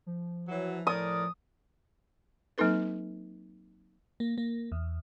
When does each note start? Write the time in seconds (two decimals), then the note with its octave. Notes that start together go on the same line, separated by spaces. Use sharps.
0.06 F3
0.47 E3 F#3
0.87 A2 A#4 D5 D#6
2.58 F#3 A#3 C4 D#4 A4 B4
4.20 A#3
4.38 A#3
4.72 E2